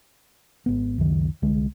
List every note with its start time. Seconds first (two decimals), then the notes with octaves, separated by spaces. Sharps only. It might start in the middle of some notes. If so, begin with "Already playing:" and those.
0.66 G#1 B3
0.98 C#2 F#2 D#3
1.42 C2 D3 G#3